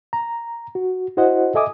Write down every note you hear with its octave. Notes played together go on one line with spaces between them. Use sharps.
A#5
F#4
E4 F#4 C5 D#5 F#5
A4 D#5 E5 G#5 D6 D#6